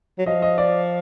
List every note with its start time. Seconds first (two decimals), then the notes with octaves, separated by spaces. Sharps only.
0.19 F#3
0.26 F3 D#5
0.42 D#5
0.58 D5